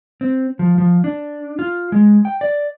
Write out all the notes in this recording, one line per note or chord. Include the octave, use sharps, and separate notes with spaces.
C4
F3
F3
D4
F4
G#3
G5
D5